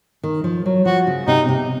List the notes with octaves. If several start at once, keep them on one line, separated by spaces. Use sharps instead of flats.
D#3
F3
F#3
F3 F#4
C#3
C3 D#4
C3